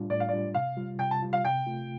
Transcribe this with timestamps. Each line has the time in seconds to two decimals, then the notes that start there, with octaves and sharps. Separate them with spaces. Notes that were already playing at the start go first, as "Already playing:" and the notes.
Already playing: A2 G3 D4 F4
0.10 A2 D5
0.20 F5
0.29 G3 D4 F4 D5
0.54 C3 F5
0.77 G3 F4
0.99 C3 G5
1.11 A5
1.22 G3 F4
1.33 F5
1.44 C3 G5
1.67 A3 F4